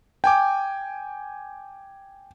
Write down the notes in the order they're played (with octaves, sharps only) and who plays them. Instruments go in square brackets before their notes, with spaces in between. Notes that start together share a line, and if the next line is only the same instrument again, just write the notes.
[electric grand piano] G5 G#5 D6